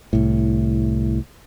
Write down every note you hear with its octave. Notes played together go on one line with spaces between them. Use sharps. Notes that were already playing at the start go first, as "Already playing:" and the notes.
C2 A2